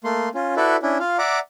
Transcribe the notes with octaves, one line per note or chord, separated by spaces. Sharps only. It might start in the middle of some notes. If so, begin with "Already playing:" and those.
A3 A#3 C6
C#4 F4
E4 F#4 A4 B4 D5 E5
C#4 D4 E4
F4 F5
D5 E5 F#5 A#5 D6